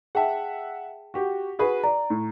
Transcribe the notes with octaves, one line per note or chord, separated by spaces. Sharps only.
G#4 E5 F#5 G5 A5
F#4 G4
F#4 G#4 B4
D5 A#5
A2